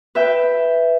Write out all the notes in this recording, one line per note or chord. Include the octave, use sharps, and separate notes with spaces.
B4 E5 G5